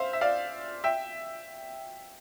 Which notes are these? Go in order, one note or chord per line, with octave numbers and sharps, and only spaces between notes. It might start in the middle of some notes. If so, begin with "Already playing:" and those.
Already playing: C5 E5 F5
E5
D5 F5
E5 G5